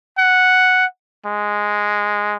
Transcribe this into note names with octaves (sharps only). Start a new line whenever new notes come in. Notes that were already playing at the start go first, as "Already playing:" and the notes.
F#5
G#3